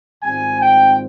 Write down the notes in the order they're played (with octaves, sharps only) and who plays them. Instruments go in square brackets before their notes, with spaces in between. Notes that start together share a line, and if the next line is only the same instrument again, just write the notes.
[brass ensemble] G#1 G#2 G3 C4 F4 [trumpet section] G#5
[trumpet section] G5